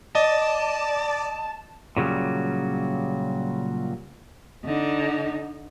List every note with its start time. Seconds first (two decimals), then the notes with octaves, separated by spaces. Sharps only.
0.15 D5 D#5 A5
1.97 A#2 C#3 F#3 G3
4.65 D3 D#4